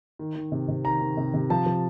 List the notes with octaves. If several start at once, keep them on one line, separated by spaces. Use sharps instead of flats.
D#3
D#3
C3
C3
D#3 A#5
D#3
C3
C3
F3 A5
F3